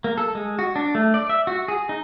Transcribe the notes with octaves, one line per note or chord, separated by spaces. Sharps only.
A#3
A4
G#3
F#4
D4
A3
D5
E5
F#4
G#4
D#4